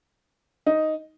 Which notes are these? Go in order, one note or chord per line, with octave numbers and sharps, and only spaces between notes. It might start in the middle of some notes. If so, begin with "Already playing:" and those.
D#4